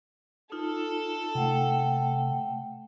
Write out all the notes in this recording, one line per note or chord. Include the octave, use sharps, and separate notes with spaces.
D#4 F4 A4
C3 A3 F#5 G5